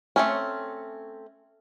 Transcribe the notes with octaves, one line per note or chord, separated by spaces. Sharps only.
A3 C4 C#4